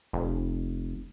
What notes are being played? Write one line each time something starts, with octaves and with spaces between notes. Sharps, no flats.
F1